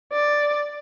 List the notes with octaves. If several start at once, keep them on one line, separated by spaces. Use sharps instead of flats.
D5